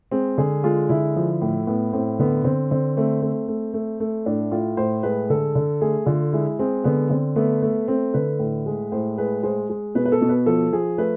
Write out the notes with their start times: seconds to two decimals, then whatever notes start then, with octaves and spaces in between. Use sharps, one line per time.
0.11 G#3 C4
0.38 D3 G#4
0.64 G#3 F4
0.89 D3 E4
1.16 F3
1.42 A2
1.67 A2 B3
1.93 A2 C4
2.19 D3 B3
2.44 D3 C4
2.71 D3 C4
2.97 A3 C4
3.22 A3
3.48 A3
3.74 A3
4.00 A3
4.26 A2 D4
4.51 A2 F4
4.77 A2 C5
5.03 G#3 B4
5.30 D3 A4
5.55 D3
5.81 A3 G#4
6.06 D3 F4
6.32 G#3 E4
6.59 G#3 C4
6.84 D3 B3
7.10 D3 C4
7.36 A3 B3
7.62 A3
7.88 A3 C4
8.14 D3 B4
8.39 A2
8.66 G#3
8.92 A2 C5
9.18 G#3 B4
9.43 G#3 C5
9.70 G#3
9.95 B2 B4
10.05 B4
10.12 A4
10.21 B2
10.29 B4
10.46 F3 A4
10.72 F3 G#4
10.98 A3 B4